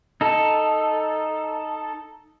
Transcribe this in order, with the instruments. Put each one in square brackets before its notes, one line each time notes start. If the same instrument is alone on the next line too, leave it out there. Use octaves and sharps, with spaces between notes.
[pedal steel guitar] D#4 A4